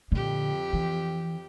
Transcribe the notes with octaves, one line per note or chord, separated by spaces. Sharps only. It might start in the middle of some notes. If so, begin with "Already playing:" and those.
F2 A#2 D3 G4
E3